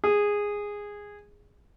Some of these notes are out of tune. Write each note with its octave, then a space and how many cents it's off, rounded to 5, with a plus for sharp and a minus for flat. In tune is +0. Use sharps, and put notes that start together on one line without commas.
G#4 -10